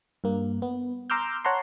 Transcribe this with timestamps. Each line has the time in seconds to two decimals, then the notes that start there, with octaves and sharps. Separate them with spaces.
0.24 G2 A#3
0.62 B3
1.10 A#5 C6 D6 E6 F6 G6
1.45 C#5 F#5 A5 A#5 C6